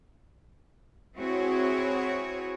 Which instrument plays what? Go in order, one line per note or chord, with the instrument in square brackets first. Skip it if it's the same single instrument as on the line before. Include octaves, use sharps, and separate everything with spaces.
[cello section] C4 E4 F#4 G#4 C#5